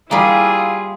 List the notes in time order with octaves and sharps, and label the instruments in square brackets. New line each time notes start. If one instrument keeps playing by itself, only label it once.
[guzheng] G3 A#3 [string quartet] E4 F4 G#4